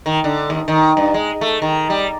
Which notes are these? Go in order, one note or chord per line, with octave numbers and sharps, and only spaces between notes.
D#3
D3
D#2
D#3
G2
G#3
A3
D#3
G3